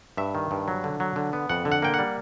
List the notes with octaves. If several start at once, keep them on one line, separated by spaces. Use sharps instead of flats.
G2 E5
D#3
G2
F#3
D3
F#3
D3
B3
F2 F#5
D3
F#5
A#3 G5
G3 F#5